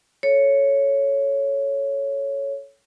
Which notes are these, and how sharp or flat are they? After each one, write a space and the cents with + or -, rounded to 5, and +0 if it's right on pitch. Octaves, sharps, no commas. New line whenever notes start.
A4 -5 C#5 +0